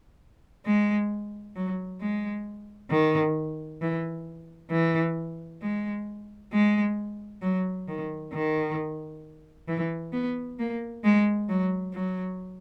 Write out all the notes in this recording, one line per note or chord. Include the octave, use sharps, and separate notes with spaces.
G#3
F#3
G#3
D#3
E3
E3
G#3
G#3
F#3
D#3
D#3
E3
B3
A#3
G#3
F#3
F#3